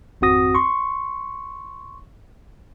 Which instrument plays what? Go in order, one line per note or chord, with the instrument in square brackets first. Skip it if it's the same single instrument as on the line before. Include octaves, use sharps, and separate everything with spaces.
[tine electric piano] G#1 F2 C4 F#4 D#6 A#6
C6 C#6